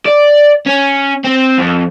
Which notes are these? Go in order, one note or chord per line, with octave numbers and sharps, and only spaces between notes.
D5
C#4
C4
F2